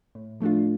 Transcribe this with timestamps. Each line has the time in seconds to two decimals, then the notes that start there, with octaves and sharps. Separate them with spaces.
0.15 A2
0.41 F3 A3 D4 F4